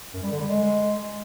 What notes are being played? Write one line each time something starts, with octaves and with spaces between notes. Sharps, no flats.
F#2
G3
D3
G3
G#3